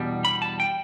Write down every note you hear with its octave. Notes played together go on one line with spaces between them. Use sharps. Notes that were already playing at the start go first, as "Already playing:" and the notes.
Already playing: E2 B2 G3 D4
B5
A5
G5